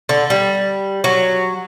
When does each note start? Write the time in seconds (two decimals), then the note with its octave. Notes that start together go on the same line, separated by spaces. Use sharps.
0.09 D3
0.30 G3
1.04 F#3